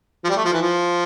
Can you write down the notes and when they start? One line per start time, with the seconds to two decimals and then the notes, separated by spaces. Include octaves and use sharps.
0.24 F3
0.29 G3
0.37 A3
0.45 F3
0.53 E3
0.61 F3